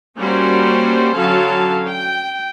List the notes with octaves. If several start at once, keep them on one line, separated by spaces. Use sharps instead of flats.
G3 A#3 C#4 F#4 C5
D3 F#3 C#4 F5 A5
G5